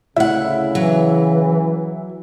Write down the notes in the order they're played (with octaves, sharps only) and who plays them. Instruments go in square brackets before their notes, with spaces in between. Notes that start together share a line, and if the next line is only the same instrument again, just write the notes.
[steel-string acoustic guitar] D2 F#5 [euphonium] C#3 [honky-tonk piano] E4
[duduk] E3 [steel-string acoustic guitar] F#3